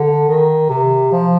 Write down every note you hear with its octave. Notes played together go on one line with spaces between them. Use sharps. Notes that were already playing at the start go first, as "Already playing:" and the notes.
Already playing: D3
D#3
C3
F3